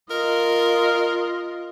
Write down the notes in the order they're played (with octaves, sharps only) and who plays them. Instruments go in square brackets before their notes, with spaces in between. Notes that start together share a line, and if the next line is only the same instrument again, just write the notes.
[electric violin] F4 D#5 [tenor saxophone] A#4